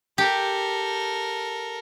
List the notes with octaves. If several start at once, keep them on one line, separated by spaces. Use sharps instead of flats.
G4 A4 A#4